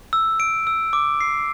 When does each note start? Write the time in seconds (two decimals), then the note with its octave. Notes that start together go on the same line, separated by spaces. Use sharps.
0.13 E6
0.40 D7
0.67 E6
0.93 D6
1.21 C7